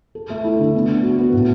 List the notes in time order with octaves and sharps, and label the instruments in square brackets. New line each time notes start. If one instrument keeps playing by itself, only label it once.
[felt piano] A4
A3
E4
D3
B3
D4
F#4
B3
A2